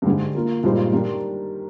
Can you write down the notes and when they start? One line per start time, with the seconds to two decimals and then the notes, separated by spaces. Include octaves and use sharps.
0.02 G2
0.05 G#2 D3 G3 D4 G#4
0.35 A#3 F4 A#4
0.63 G2 A#2 G#3 D#4 G4 C5
0.92 D#3 G3 D4 G4 A#4